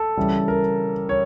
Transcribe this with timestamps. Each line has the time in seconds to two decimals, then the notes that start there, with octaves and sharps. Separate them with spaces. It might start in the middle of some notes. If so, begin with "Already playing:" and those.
Already playing: A4
0.17 C#3 E3 G3
0.48 A#4
1.09 C#5